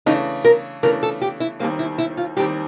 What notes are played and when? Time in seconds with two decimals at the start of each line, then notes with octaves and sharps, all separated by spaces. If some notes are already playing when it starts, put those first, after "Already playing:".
0.06 C#3 E3 A3 D4 D#4
0.45 A#4
0.83 C#3 E3 A3 D4 A#4
1.03 A4
1.22 G4
1.40 E4
1.59 D#2 D#3 G3 A#3 C4
1.79 E4
1.98 E4
2.17 F4
2.37 D#2 D#3 G3 C4 G4